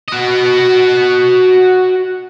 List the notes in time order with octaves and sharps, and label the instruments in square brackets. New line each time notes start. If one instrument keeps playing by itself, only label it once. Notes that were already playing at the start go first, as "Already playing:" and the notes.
[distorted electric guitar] F#4 D#5